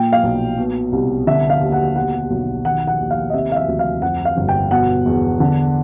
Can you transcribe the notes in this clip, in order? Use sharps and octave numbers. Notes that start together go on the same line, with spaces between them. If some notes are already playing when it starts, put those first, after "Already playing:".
Already playing: A#2 G5
F5
B1
B2
C2
D3 E5
F5
D#2
F#5
B2 F#5
B1
D#3 F#5
F#5
D#2
F5
D#5
C3 E5
F5
E5
D2
F5
F2 F#5
F5
G1
G5
B2 F#5
E2
D3